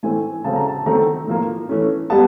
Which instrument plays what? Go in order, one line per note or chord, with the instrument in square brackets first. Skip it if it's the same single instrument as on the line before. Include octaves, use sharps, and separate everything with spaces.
[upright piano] A2 E3 A3 C4 G#5
C#3 F#3 A3 C4 A5
A#5
A5
D#3 F#3 A3 C4 A#5
A2 F3 A#3
E3 A3 C#4
G3 B3 A5